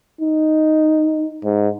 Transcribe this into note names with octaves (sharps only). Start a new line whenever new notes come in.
D#4
G#2